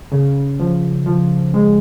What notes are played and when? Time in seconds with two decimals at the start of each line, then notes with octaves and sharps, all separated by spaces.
0.12 C#3
0.59 F3
1.06 F3
1.54 G#3